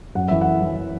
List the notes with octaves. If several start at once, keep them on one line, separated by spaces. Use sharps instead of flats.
F#2 F#5
E3 E5
E3 F#5
E3